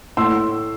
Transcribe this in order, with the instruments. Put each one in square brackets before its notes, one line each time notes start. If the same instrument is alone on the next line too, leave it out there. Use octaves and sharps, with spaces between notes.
[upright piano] A2 C6 E6